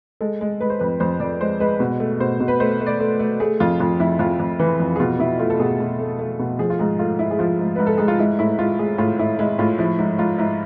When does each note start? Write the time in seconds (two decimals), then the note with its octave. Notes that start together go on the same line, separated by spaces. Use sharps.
0.21 G#3 A4
0.41 G#3
0.60 G#3 B4
0.70 C5
0.80 F2 B4
1.00 F2 C5
1.20 F2 D5
1.41 G#3 C5
1.60 G#3 B4
1.80 B2
2.00 A3
2.20 B2 C5
2.40 B2
2.48 B4
2.60 A3 C5
2.80 A3
2.87 D5
3.00 A3
3.19 A3
3.40 A3 G#4
3.60 F2 F4
3.80 F2 F4
4.00 F2 E4
4.19 F2 F4
4.40 F2
4.59 E3 B4
4.80 F2
4.96 G#4
4.99 B2 F4
5.19 B2 E4
5.39 A3 F4
5.50 A4
5.60 B2 G#4
5.80 B2
5.99 A3
6.19 A3
6.39 B2
6.59 F3 G#4
6.70 F4
6.79 G#2 G#4
6.99 A3 F4
7.19 G#2 E4
7.31 G#4
7.39 F3 F4
7.59 G#2
7.76 G#2 B4
7.87 A4
7.98 G#2 G#4
8.08 F4
8.19 G#3 E4
8.39 A2 E4
8.59 G#3 F4
8.79 G#3 G#4
8.98 A2 F4
9.19 A2 E4
9.39 G#3 E4
9.59 A2 F4
9.78 F3 E4
9.99 G#2 E4
10.18 G#2 F4
10.38 G#2 E4